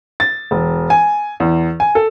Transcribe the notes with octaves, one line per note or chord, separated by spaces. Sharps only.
A6
E1
G#5
E2
G#5
A4